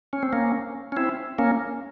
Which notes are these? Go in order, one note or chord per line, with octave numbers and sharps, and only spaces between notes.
C#4
C4
A#3 C#4
C#4
C4 E4
A#3 C#4